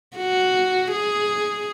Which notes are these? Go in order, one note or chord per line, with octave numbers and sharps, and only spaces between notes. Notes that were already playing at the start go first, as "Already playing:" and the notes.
F#4
G#4